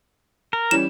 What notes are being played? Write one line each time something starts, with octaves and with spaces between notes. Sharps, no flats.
A#4
E3 G3 C#4 E7